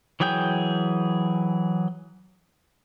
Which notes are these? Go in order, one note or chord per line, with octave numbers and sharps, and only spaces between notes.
E3 F#3 G#4 G5 G6